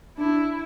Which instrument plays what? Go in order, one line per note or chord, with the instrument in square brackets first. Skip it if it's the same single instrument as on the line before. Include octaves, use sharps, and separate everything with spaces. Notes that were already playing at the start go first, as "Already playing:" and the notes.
[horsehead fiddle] D4 [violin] E4